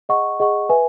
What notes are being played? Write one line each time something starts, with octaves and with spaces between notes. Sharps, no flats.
G#4 D#5 F#5 C#6
G#4 D#5 F#5 C#6
B4 E5 G#5